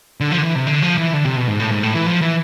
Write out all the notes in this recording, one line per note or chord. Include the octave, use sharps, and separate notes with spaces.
D3
F3
D3
E3
C3
D3
F3
E3
D3
C3
B2
G#2
A2
G#2
A2
E3
F3
E3